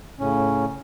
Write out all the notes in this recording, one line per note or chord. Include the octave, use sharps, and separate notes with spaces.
A2 C#3 C#4